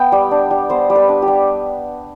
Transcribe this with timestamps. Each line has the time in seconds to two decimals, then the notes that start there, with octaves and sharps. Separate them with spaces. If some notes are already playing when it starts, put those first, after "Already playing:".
Already playing: B3 G5
0.12 G3
0.31 D4
0.51 G3
0.70 B3 C5
0.90 G3
0.95 B4
1.09 D4
1.22 G4
1.28 G3